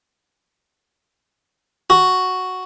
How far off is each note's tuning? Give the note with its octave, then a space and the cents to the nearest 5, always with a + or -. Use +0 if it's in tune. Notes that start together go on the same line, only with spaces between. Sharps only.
F#4 +0